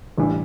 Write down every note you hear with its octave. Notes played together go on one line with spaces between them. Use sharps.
A1 G2 E3 G3